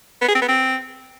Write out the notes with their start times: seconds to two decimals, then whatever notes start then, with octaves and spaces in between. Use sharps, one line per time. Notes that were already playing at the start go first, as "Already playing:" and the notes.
0.21 B3
0.28 G#4
0.35 C4
0.42 B3
0.48 C4